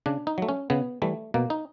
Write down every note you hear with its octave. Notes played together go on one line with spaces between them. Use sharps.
C#3 D4
D#4
F#3 A3
C#4
C#3 B3
E3 G3 A3
B2 A#3
D#4